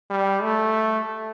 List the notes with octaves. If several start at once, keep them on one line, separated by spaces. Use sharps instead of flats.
G3
A3